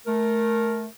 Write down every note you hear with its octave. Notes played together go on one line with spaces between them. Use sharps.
A3 A#4